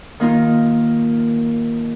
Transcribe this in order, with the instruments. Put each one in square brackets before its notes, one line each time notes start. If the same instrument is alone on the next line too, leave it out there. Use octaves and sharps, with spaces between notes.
[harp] D#3 A#3 D#4 F4